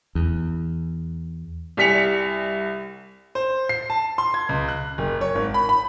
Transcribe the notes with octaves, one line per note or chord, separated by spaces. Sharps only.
E2
C2 G3 G#5 B6 C#7 F7
C5
C7
A5
C6
G#6
C#2
F#6
F#1
C#5
G#1
B5
B5